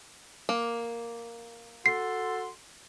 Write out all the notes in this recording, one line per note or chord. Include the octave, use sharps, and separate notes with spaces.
A#3
F#4 A4 C6 C7